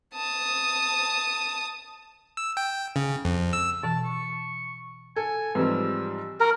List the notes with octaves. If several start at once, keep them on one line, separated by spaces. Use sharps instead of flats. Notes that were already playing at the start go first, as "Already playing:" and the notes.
A5 D#6
E6
G5
C#3
F2
E6
B2 E3 A5
C#6
A4 G#5
G#2 E3 F3 G3 C4 B4 E6
F#4 A#4